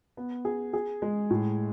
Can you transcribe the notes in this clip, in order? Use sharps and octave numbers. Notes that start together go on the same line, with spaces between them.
B3
G#4
G#4
G#3
A2